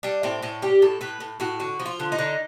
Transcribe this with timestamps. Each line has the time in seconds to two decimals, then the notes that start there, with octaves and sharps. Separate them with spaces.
0.03 G3 D4
0.23 A2 C4
0.42 A2 C#4
0.62 G3 G4
0.82 A2 A4
1.01 A2 B4
1.20 A2
1.40 A2 F#4
1.60 D3 F#4
1.80 F3
1.86 F4
2.00 D3
2.12 D#4
2.19 D3